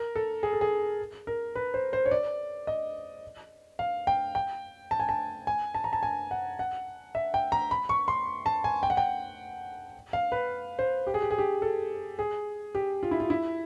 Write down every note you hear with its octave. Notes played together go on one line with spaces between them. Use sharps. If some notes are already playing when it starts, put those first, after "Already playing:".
Already playing: A#4
A4
G#4
A4
G#4
A#4
B4
C5
C5
C#5
D5
D#5
F5
G5
G5
A5
G#5
A5
G#5
A5
A#5
A5
G#5
F#5
F#5
E5
G5
A#5
B5
C#6
C6
A5
G#5
G5
F#5
G5
F5
B4
C5
G4
G#4
G4
G#4
G4
A4
G#4
G4
F4
E4
F4
E4